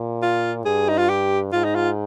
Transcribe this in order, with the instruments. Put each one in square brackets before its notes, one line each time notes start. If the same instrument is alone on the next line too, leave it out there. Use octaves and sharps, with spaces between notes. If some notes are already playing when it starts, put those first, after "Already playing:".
Already playing: [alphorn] A#2
[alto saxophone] F4
[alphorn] G2 [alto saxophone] G#4
[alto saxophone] D#4
F4
G4
[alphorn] G#2 [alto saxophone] F4
[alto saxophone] D#4
F4